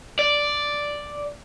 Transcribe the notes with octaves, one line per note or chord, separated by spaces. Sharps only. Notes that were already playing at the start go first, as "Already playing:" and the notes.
D5